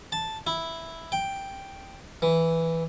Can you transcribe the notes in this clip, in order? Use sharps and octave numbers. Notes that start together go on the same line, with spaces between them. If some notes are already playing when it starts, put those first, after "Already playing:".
A5
E4
G5
E3